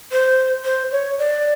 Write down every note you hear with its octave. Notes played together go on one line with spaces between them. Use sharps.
C5
C5
C#5
D5